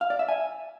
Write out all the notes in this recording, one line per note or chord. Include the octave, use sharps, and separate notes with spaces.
F5
D5
E5
G#5